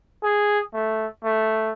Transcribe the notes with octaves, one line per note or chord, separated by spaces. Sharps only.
G#4
A3
A3